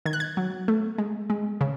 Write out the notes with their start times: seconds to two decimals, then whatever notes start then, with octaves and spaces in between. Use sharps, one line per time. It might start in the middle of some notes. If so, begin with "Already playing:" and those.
0.06 D#3 G#6
0.13 F#6
0.20 G#6
0.37 F#3
0.68 A3
0.98 G#3
1.30 G#3
1.61 C#3